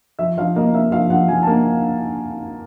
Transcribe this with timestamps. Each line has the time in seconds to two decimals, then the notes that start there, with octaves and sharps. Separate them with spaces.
0.19 F3 E5
0.37 F3 F5
0.55 A#3 D#5
0.74 A#3 E5
0.92 F3 F5
1.10 F3 F#5
1.28 F3 G#5
1.43 A5
1.47 A#3